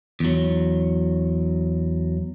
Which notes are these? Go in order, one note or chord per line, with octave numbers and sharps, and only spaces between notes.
E2 F#3